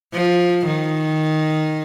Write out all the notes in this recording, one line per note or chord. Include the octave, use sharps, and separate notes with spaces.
F3
D#3